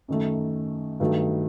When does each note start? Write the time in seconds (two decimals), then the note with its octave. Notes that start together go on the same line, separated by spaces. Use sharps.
0.08 F#2 D#3 A3
1.00 G2 D#3 F#3 A3